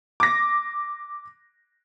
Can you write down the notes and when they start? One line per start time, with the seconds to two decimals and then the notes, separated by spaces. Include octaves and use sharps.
0.20 D6 A#6